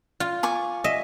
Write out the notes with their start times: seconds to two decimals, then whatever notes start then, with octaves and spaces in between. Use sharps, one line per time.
0.20 F4
0.43 G#5 C#6 D6
0.84 D#5 E5